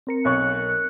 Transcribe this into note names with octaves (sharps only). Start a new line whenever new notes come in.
C4 A#4 C#7
B1 C#5 C#6 F#6